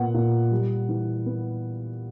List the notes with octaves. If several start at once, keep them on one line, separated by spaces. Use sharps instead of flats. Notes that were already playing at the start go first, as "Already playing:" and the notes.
Already playing: A#2 B3 F#5
A#2
G3
E3
B3